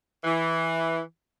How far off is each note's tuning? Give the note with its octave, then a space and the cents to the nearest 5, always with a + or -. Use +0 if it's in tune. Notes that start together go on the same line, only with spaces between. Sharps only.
E3 -5